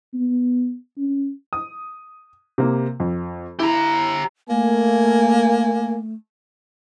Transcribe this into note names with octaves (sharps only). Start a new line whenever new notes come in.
B3
C#4
D#6
C3 A#3
F2
E4 G4 A#5
A3 A#3 G#5